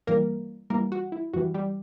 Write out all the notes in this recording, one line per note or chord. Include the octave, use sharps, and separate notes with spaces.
G2 E3 G3 A#3 A#4
G2 E3 G3 A#3 A#4
F#4
E4
F#2 E3 G3 F#4
G3 G4